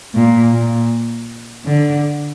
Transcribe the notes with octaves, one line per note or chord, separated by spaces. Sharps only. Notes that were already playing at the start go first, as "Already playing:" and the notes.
A#2
A#2
D3